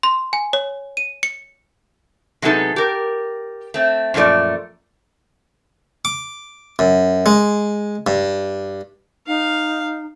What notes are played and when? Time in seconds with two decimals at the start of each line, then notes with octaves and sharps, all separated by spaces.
0.03 C6
0.33 G#5
0.53 C#5
0.97 D#7
1.23 C#7
2.42 C3 F#3 G#3 B3 D#4 A4
2.76 G4 A#4
3.74 A3 C4
4.14 F#2 A#2 F3 A3 D5
6.05 D6
6.79 F#2
7.26 G#3
8.07 G2
9.27 D#4 F5